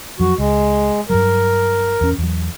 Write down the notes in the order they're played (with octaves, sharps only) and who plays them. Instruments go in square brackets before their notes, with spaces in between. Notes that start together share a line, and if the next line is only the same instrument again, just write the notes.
[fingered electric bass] F2 F#3 [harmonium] F#4
[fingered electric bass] C#2 [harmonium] G#3
[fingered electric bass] G2 F#3 G3 [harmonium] A#4
[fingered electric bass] E2 C#4
E2 F#3